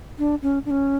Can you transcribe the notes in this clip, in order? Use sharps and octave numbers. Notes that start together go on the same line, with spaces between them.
D4
C#4
D4
C#4